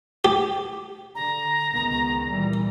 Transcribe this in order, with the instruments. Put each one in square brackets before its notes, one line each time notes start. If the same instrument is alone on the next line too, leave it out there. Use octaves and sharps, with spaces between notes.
[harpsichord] G4
[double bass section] D3 [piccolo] A#5
[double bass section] C#2 D#3 B3
A#2 E3 G3